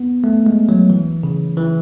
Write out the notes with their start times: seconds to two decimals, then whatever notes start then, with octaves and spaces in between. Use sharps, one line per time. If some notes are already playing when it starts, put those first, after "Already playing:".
Already playing: B3
0.24 A3
0.46 G#3
0.69 F#3
0.90 E3
1.23 C#3
1.57 E3